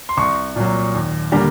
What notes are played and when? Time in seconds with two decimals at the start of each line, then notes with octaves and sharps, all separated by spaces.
0.09 C6
0.17 C2 C#6
0.56 A#2 F#3
0.94 D#2
1.32 D3 G3 A#3